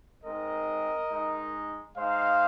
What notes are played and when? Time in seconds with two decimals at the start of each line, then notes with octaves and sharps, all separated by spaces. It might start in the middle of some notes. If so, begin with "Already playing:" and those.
0.23 G#3 C4 D#4 A#4 D#5
1.11 G#3 D#4
1.97 G#3 D#4 C5 F5